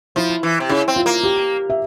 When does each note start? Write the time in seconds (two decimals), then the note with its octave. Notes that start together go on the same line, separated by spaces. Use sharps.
0.16 F3 E4
0.43 E3
0.60 C3
0.69 C#3 E4
0.88 C4
0.96 F4
1.06 A#3
1.24 G4
1.70 E5